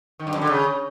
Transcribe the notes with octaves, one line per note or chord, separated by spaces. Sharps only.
D#3
G2
F#2
D3
C#3